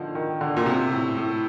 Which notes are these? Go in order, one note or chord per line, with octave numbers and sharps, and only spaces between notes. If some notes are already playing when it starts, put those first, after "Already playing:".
Already playing: D3 D#3 F3
D#3
D3
A#2
C3
A2
A2